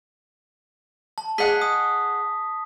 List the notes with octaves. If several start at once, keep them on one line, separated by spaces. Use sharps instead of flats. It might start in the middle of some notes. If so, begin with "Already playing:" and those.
A5
G#4 D#5 F#5 B6
D#6